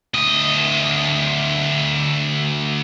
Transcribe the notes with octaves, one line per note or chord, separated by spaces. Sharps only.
D2 D#5